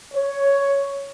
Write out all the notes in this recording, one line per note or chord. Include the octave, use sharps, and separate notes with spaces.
C#5